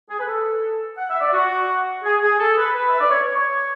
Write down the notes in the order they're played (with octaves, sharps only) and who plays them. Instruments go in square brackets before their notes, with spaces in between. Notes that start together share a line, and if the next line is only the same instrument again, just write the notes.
[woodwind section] G#4
B4
A4
F#5
E5
D5
F#4
G#4
G#4
A4
B4
B4
E5
D5
C#5
C#5